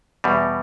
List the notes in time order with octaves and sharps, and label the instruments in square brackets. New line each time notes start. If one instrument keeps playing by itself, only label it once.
[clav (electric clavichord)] E2 B2 G3